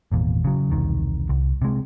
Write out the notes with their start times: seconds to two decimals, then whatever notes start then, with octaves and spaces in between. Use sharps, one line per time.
0.12 G#1 E2 A#2
0.44 C#3 F#3
0.70 E1 C2 D#3
1.29 C2
1.62 C3 G#3